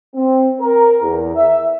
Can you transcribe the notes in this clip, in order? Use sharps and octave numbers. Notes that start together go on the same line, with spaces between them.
C4
A#4
E2
E5